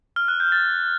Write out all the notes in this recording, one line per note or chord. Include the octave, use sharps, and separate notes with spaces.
F6
F#6
G6
A6